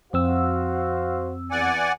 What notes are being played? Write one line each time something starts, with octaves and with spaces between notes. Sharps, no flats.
F2 C4 F#4 C5 F5 E6
E2 D5 F#5 G#5